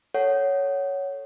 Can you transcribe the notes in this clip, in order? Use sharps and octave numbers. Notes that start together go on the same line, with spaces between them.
A4 C#5 F#5